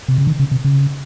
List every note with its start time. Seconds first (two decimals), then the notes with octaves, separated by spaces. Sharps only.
0.08 C3
0.18 C#3
0.27 D#3
0.40 C#3
0.51 C3
0.65 C#3